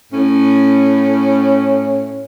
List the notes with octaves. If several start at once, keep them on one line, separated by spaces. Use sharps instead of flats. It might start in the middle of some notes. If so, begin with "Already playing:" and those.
A2 C#4